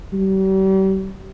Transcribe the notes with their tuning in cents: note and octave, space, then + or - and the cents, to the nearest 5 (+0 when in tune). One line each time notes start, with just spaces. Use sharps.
G3 -40